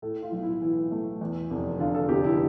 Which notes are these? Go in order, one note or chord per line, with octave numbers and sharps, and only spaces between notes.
A2 A4
F4
B1
E4
E3 E4
A3
E2
F1
D3 F4
A4
F1 G4
E4